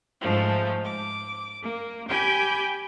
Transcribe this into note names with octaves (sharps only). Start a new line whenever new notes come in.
G#2 F3 A3
D6
A#3
G4 G5 G#5 B5 G6